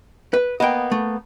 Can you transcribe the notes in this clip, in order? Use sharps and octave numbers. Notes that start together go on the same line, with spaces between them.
B4
A#3 B3 D#5 G5
A3